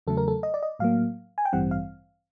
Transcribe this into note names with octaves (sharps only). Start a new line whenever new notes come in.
E2 C#3 F#3 A3 A4
A#4
A4
D#5
D5
D#5
A2 F#3 A#3 F5
G#5
G5
A1 G2 E3 G3 C4 F#5
F5